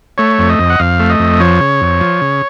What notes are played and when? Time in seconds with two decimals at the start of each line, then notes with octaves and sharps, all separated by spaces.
0.18 A3 C#5
0.39 F2
0.49 D#5
0.59 F2
0.70 F#5
0.79 F2 F5
1.00 A3
1.10 D#5
1.19 F2
1.40 F3 C#5
1.61 C#3
1.81 F2
2.01 F3
2.21 C#3